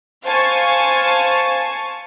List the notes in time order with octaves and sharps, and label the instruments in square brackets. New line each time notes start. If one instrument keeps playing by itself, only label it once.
[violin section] C5 F5 G#5 A5 C#6